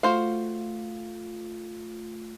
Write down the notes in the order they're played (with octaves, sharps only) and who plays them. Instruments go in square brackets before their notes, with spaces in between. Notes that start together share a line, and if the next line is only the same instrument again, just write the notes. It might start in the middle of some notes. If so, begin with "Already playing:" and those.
[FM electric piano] A3 F4 [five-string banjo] F#4 C5 F5